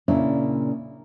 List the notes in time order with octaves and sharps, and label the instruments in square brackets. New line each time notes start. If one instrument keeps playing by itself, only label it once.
[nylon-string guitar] A#2 C#3 D4 E4